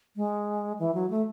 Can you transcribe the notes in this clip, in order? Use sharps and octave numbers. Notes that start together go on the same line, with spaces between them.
G#3
E3
F#3
A3